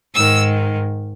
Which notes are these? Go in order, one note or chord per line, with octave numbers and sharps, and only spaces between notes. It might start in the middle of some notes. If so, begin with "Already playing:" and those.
G#2 D#3 E6